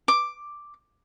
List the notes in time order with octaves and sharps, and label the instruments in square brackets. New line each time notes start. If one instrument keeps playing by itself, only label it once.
[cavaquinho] D6